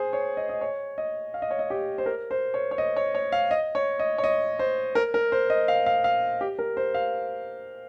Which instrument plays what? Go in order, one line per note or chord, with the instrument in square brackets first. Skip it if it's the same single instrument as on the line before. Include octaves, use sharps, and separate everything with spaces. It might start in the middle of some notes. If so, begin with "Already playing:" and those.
Already playing: [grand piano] G#4 C5
C#5
D#5
D#5
C#5
D#5
F5
D#5
C#5
D#5
G4
C5
A#4
C5
C#5
C#5
D#5
C#5
C#5
F5
D#5
C#5
D#5
C#5
D#5
C5
A#4
A#4
C5
D#5
F5
F5
F5
G4
A#4
C5
F5